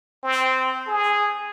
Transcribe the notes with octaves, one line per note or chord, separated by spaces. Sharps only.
C4
G#4